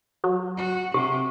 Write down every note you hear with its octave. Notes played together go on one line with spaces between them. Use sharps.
F#3
F#4
C3 G4